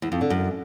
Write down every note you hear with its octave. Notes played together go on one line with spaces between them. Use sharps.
E2
F2
D3
F#2